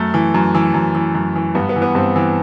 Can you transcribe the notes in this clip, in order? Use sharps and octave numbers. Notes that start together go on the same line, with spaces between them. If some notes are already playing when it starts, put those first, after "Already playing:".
Already playing: F#2 A3
E3
F#2
E3
F#2
E3
F#2
E3
G2 B3
B3
E3
B3
G2 C4
E3